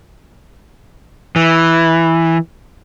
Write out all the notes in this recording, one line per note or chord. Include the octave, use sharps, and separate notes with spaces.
E3